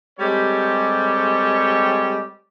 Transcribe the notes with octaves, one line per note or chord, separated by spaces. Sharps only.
G3 G#3 C4 G4 A4 C#5